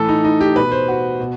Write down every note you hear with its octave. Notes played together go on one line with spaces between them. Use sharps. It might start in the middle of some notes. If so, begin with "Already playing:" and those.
Already playing: A2 E3 A4
D#4
D#4
G4
B2 B4
C5
F#4
B2